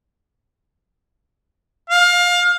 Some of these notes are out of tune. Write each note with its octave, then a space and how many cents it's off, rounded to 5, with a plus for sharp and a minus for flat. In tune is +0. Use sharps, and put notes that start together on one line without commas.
F5 +25